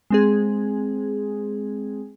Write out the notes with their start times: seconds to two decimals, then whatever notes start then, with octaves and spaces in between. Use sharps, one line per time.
0.10 G#3 C4 G#4